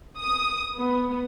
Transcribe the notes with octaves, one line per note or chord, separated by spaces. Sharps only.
D#6
B3